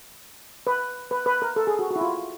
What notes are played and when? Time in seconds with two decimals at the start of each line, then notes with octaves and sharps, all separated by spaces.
0.67 B4
1.11 B4
1.26 B4
1.42 A#4
1.56 A4
1.67 G#4
1.79 F#4
1.90 F#4
1.96 E4
2.01 F4